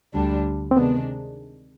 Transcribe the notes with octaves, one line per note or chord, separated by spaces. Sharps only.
D2 D3 G3 D4
C4
C3 D#3 G#3 B3 D4